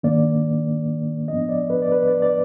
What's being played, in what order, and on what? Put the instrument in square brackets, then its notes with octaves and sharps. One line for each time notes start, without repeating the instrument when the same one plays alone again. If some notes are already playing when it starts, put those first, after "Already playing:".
[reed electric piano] G#2 D#3 A#3 D4 D5
G#2 F3 B3 D4 D#5
D5
B4
D5
B4
D5
D5